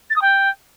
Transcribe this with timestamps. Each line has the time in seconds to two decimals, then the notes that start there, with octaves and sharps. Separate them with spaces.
0.10 A6
0.15 D#6
0.21 G5